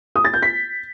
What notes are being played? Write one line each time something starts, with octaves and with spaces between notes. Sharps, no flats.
D#6
A6
G6
B6